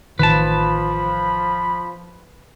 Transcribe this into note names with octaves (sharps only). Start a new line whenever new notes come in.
A1 D#3 F3 B4 A5 B5